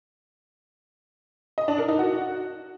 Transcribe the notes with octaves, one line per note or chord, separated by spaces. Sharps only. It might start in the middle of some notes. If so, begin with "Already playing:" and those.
D#5
D4
A#4
D#4
F#4